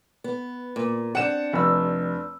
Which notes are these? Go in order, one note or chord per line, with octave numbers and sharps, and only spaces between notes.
B3
A#2
C4 D4 F#5 E7
F1 E6